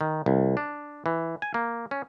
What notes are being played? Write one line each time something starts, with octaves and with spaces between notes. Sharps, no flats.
D#3
C2
D4
E3
G#5
A#3
C#4